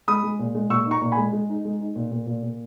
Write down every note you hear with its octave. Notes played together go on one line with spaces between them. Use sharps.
G#3 B5 D#6
G#3
A#2
G#3
A#2 C#6 E6
D#4
A#5 C#6
A#2
G#5 B5
G#3
G#3
D#4
G#3
D#4
A#2
A#2
A#2
A#2